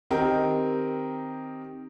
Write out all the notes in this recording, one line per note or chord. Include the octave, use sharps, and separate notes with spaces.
D#3 C4 D#4 G4 A#4